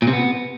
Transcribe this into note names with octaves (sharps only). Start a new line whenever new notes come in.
A#2
C3
B3